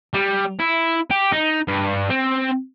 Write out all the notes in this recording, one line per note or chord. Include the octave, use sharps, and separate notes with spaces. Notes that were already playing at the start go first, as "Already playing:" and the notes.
G3
E4
G4
D#4
G2
C4